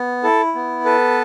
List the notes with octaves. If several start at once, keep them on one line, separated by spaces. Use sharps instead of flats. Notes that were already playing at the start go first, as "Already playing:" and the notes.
Already playing: B3
E4 A4
B3
A4 B4